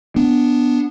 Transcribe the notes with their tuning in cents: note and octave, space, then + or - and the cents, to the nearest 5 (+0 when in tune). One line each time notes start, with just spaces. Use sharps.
B3 +0 D4 +0